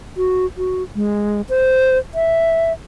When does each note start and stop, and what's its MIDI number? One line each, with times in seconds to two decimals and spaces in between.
0.17 0.46 66
0.58 0.83 66
0.96 1.41 56
1.49 1.98 72
2.15 2.72 76